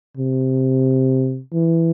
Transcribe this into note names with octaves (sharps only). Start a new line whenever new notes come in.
C3
E3